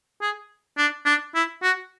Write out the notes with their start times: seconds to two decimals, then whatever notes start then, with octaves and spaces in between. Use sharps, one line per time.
0.22 G#4
0.78 D4
1.06 D4
1.35 E4
1.63 F#4